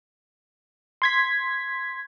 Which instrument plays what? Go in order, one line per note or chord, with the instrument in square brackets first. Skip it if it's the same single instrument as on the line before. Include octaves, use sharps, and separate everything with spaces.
[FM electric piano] C6 G#6 B6